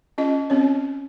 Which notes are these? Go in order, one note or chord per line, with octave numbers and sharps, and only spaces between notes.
C#4 F4 D#5
C4 C#4 C#5